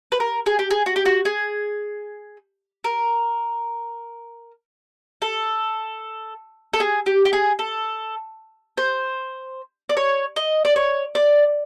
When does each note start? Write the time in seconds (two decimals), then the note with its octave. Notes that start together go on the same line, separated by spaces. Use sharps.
0.12 B4
0.20 A#4
0.46 G#4
0.59 G4
0.71 G#4
0.86 F#4
0.96 G4
1.05 F#4
1.25 G#4
2.84 A#4
5.22 A4
6.74 A4
6.80 G#4
7.06 G4
7.25 G4
7.33 G#4
7.59 A4
8.78 C5
9.89 D5
9.97 C#5
10.36 D#5
10.65 D5
10.76 C#5
11.15 D5